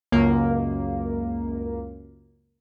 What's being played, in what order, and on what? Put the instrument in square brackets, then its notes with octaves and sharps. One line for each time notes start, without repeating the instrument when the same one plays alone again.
[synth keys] C#2 F#2 A#3